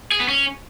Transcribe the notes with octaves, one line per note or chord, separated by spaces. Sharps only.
G#4
B3
C#4